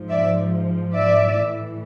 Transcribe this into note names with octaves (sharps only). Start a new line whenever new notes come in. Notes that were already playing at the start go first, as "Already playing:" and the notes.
Already playing: G#2 F3
D5 E5
D5 E5
A2 E3